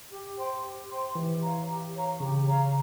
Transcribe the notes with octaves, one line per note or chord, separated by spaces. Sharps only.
G4
C5 G5 C6
G4
C5 G5 C6
E3 G4
C#5 F5 A#5
G4
C#5 F5 A#5
C#3 G4
C#5 F5 A#5